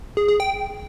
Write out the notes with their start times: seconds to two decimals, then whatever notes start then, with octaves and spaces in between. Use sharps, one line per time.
0.17 G#4
0.28 G#4
0.40 G5